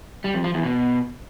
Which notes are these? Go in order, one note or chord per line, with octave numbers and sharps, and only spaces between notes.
G3
F2
F3
E2
B2